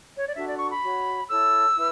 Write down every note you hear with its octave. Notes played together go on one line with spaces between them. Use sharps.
C#5
D5
D4 F#4 A4 E5
D5
C#6
B5
F#4 C#5
E4 A4 C#5 E6
E4 B4